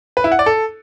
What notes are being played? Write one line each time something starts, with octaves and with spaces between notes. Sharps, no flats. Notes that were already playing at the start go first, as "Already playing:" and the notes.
B4
E4
F#5
D5
A4